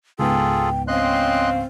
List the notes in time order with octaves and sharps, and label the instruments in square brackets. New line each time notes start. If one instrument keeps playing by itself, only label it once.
[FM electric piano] C#2 G#2 B3 [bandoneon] F4 G#4 A4 [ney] G5
[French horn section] C4 C#4 [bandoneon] D#5 C6 F#6 [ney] F5